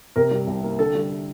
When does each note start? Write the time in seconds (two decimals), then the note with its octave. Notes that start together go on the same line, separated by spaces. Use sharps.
0.16 C3 A#4
0.31 G3
0.47 C2
0.64 A#3
0.79 D3 A4
0.95 G3